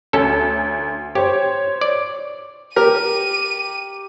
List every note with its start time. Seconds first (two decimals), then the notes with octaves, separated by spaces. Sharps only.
0.13 D2 C#4 A4
1.15 G4 C5 C#5
1.81 D5
2.76 G4 A#4 D#7